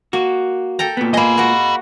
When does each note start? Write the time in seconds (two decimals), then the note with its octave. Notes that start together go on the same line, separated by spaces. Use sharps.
0.13 A#3 F#4
0.79 A4 G5 A#5
0.97 A#2 B3
1.14 G#3 A#3 D#5 B5
1.37 A#3 F#4